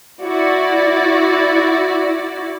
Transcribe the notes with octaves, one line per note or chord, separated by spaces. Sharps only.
E4 F#4 D5